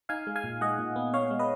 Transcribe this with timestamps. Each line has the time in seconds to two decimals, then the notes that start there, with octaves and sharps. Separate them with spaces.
0.09 D#4 F5 G#5
0.27 G#3
0.36 F5 G#5
0.44 A#2
0.61 G#3 D#5 F#5
0.79 A#2
0.96 B3
1.14 B3 C#5 F5
1.31 G#3
1.39 B4 D#5